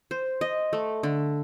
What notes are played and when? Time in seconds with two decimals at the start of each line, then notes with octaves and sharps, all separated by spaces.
0.11 C5
0.41 D#5
0.73 A3
1.03 D3